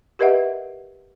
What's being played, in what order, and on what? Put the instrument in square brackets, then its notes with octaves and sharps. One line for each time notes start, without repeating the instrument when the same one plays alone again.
[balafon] G4 A#4 B4 D#5 E5 F#5